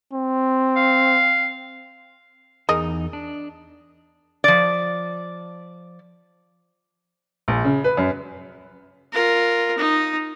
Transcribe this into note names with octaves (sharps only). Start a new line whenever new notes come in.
C4
F5
E2 D#4 G#4 A#4 D#5
D4
F3 D5
A#1
C#3
B4
F#2
F4 A#4
D#4